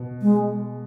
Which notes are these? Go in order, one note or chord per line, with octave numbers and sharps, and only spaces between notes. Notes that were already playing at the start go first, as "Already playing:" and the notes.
Already playing: B2
G#3